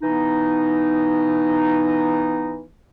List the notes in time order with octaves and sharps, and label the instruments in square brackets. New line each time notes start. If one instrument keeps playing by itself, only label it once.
[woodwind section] E3 B3 D#4